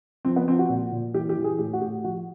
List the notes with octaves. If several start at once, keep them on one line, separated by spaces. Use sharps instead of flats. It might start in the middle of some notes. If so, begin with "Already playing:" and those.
F3 C4
B3
F3 C4
F#4
A#2
A#2
E3 G4
G4
E3
G#4
A2 G4
F#4
A2 G4
F3 F#4